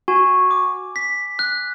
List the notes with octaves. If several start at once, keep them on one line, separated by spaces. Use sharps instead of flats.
F#4 G#5
D6
B6
F#6